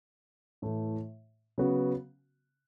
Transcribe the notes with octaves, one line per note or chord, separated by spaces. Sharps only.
A2 E3 A3
C#3 F#3 B3 F#4